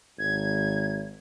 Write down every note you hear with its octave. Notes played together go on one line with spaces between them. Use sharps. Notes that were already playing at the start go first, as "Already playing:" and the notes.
G#1 G#6